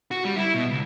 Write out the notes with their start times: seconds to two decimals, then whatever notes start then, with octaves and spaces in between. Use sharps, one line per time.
0.11 F#4
0.25 G3
0.37 E4
0.55 B2
0.69 C#2